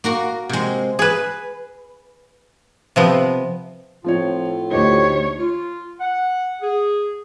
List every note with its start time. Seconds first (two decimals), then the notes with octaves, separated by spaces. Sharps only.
0.04 A#3 F#4 A#4
0.49 C3 G#3
0.99 G#4 B4
2.96 C3 F3 B3
4.04 A2 F3 C4 F4 C#5
4.71 D2 D#4 G4 C5 C#5
5.38 F4
6.00 F#5
6.62 G#4